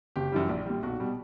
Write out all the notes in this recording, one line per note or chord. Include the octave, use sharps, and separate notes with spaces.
F#1 G4
F#2 E3 G3
A#1
A#2 G3
B1 F#4
B2 G3